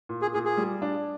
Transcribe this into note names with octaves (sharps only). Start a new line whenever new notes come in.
A#2
G#4
A#2 G#4
G#4
G3
D4